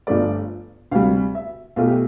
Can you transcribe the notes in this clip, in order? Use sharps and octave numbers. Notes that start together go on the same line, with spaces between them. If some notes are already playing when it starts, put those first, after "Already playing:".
G1 G2 F3 A3 D5
D2 C3 G3 F5
E5
B1 B2 A3 F4
G4